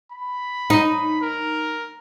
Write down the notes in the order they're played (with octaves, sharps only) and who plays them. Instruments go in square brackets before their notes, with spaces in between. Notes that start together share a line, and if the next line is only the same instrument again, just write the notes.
[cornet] B5
[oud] D#4
[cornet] A#4